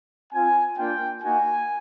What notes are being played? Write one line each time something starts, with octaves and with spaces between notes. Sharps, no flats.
C4 F4 G#5
A#3 D4 F4 G5
A#3 D#4 F#4 G#5